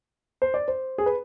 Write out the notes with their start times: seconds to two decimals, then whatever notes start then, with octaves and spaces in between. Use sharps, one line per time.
0.42 C5
0.54 D5
0.68 C5
0.98 G#4
1.06 B4